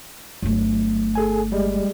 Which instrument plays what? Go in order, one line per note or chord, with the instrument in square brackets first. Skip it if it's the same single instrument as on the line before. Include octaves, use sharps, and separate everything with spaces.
[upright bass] G1 A3 [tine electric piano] F#3
[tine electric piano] G#4 A4 G#5
G3 G#3